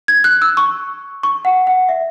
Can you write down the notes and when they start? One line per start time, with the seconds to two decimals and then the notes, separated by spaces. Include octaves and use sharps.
0.08 G#6
0.24 F#6
0.42 E6
0.57 C#6
1.23 C#6
1.45 F#5
1.67 F#5
1.89 E5